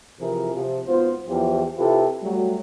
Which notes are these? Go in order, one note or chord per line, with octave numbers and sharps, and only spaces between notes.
C3 E3 F3 E4 G#4 A#4
C3 F3
G#1 B3 F4 C5
E2 E3 F3 G4 C5
C3 E4 F4 G4 A4 B4
F#3 G3 A3